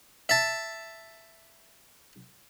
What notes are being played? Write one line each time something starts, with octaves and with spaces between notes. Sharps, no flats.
E5 A5